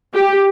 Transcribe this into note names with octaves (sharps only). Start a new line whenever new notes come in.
G4